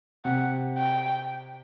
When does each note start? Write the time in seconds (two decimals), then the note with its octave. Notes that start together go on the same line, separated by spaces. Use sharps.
0.25 C3 F#5
0.78 G5